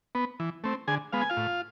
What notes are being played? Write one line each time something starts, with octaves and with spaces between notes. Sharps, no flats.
B3
E3
A3 C4
D3 G#4 G#5
G#3 B3 F5
G#5
F4 F5
A2